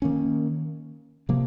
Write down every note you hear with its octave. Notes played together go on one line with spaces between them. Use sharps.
D#3 A#3 C#4
C3 F3 A#3